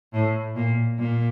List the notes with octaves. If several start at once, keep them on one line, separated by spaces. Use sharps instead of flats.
A2
A#2
A#2